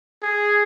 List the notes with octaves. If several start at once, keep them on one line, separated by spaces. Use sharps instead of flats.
G#4